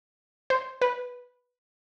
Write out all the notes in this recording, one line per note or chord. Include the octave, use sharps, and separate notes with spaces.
C5
B4